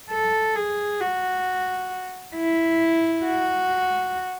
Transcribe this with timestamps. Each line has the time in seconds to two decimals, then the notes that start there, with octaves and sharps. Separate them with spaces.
0.10 A4
0.56 G#4
1.01 F#4
2.36 E4
3.25 F#4